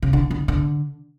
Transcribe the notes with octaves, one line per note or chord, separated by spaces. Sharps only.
C#3
D3
D3
D3